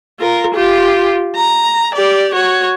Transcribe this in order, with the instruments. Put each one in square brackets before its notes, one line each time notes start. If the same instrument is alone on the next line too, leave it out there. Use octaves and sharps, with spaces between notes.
[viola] F4 A#4
F4 G4
A#5
G4 D5
F#4 C#5